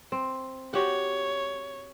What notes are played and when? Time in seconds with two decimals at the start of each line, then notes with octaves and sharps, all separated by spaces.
0.12 C4
0.74 F#4 G4 C#5 F#5